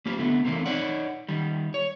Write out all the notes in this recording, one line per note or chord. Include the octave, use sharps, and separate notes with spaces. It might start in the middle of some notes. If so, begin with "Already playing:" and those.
A#3 F4 G4
D3 A3 B3
E3 F3 A3 A#3 C4 D#4
D#4 C#5 D5 F#5
D#3 G3
C#5